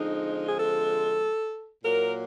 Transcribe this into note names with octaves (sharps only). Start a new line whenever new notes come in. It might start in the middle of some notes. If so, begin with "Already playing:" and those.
Already playing: D3 F3 G#3 C4 D#4
G#4
A4
A#2 F#3 A#3 A#4